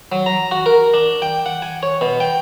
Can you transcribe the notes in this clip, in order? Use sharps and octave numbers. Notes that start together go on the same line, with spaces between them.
F#3
A#5
F#4
A#4
D4
G5
F#5
G#5
C#5
B2
G5